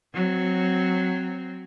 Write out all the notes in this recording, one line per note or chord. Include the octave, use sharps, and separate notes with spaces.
F#3 C4